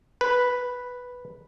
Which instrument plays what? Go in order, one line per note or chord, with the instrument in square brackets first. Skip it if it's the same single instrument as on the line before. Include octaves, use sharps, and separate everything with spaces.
[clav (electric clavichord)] B4